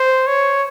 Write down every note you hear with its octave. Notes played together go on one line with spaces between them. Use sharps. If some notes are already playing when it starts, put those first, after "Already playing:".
Already playing: C5
C#5